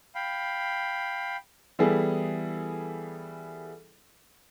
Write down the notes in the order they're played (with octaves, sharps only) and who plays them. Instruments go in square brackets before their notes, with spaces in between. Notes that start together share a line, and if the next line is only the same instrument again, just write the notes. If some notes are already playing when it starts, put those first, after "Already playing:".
[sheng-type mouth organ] F5 G5 B5
[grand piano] E3 G3 B3 E4 G#4 A4